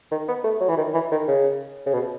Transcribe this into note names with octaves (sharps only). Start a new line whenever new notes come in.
D#3
B3
A3
F#3
E3
D#3
E3
D#3
C#3
C#3
B2